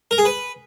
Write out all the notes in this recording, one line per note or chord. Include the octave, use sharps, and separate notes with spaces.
A#4
G#4
B4